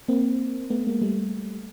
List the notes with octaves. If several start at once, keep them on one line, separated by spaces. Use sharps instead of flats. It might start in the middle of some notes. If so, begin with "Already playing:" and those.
A#3 C4
A3 B3
G#3 A#3
G3 A3